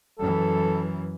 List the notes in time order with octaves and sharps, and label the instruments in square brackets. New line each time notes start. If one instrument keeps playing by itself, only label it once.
[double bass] F#2 E3 [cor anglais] A4